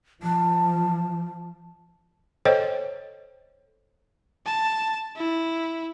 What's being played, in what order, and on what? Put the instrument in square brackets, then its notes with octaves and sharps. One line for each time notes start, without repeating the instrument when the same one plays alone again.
[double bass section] F3 [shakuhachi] A5
[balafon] A4 C5 C#5 D#5 G5
[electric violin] A5
E4